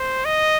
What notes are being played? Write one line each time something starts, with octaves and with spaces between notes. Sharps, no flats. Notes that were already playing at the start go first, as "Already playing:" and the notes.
Already playing: C5
D#5